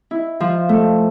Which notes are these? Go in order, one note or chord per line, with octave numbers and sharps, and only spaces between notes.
E4
F3
A3